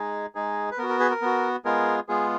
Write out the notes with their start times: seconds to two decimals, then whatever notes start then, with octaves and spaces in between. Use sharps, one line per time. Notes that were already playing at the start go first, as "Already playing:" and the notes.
Already playing: G#3 D#4 G#4
0.35 G#3 D#4 G#4
0.71 B4
0.78 B3 F#4 A#4
0.89 A#4
1.00 G#4 B4
1.10 A#4
1.22 B3 F#4
1.65 G#3 B3 F4 G#4 A#4
2.09 G#3 B3 F4 G#4